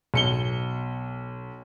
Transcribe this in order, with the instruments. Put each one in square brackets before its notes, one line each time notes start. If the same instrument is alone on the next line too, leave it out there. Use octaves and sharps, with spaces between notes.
[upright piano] B1 C#7 G7